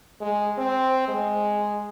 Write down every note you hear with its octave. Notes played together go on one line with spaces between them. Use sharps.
G#3
C4
G#3